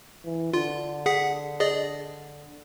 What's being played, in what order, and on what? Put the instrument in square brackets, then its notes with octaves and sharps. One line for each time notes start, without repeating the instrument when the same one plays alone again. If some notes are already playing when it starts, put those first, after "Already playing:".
[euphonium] E3
[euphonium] D3 [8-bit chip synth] F4
[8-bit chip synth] G#4 F#5 B6
G#4 D5 D#5